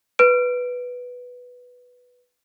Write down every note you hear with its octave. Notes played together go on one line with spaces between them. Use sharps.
B4 D7